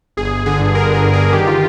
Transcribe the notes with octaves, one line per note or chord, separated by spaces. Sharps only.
G1 G#4
G1
D3 G#4
G2
G2 A#4
D3 G#4
G1
G#4
D3
D#3 G4
F4